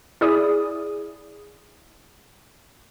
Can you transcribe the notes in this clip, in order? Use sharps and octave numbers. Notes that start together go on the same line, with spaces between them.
E4 G#4 D5 D#6